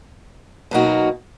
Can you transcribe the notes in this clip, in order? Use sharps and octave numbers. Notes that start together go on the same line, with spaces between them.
B2 F#3 A#3 D#4 F#4